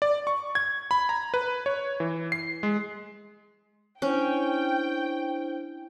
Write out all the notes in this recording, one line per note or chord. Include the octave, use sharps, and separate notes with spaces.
D5
C#6
G#6
B5
A#5
B4
C#5
E3
C7
G#3
C#4 D4 E4 C5 G5